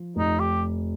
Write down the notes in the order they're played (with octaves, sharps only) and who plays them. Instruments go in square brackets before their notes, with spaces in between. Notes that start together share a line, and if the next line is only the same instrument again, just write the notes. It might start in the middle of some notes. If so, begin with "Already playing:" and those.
Already playing: [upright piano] F3
[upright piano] F1 [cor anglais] D#4
[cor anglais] G4